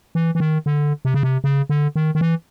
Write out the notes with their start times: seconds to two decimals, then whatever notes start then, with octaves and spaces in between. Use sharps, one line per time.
0.15 E3
0.35 E3
0.40 D#3
0.66 D3
1.05 C3
1.14 C#3
1.23 C3
1.44 C#3
1.70 D3
1.96 D#3
2.15 D#3
2.21 E3